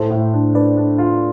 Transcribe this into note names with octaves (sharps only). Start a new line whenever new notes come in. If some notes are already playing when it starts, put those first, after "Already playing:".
Already playing: A2 A4 C5
A2
D4
D4 B4 D5
D4
F4